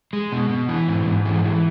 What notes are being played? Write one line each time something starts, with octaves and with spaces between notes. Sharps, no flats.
G#3
B2
B2
E3
G#2
G#2
E3
E3